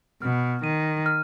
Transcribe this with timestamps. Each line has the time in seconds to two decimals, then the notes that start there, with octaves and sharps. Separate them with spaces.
0.22 B2 F6
0.63 D#3 D#7
1.06 F6